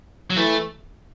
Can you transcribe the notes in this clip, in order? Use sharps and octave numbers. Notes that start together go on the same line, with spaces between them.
F#3
E3 A3